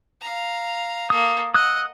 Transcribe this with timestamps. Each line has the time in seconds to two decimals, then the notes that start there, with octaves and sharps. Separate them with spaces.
0.21 F5 A#5
1.10 A#3 A4 D#6
1.54 D#5 F#5 D#6 E6 F#6